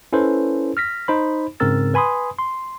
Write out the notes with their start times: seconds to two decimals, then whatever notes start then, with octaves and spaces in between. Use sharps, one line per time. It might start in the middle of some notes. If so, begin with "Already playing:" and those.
0.13 C#4 E4 A4 B4 C5
0.77 F6 A#6 B6
1.08 D#4 C5 B5
1.60 G#2 C#3 C4 A#4 E6 A6
1.94 B4 G#5 B5 C6 D#6
2.39 C6